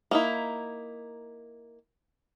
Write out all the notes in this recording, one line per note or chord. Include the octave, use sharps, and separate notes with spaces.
A#3 D#4 E4